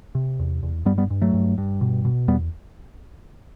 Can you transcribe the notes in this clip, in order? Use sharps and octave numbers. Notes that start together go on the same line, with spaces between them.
C3
E2
E2
G2 G3 B3
G3 B3
G2
F#3 A3
G2
G2
B2
B2
E2 G3 B3